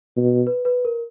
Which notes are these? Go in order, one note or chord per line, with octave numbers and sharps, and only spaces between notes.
B2
B4
B4
A#4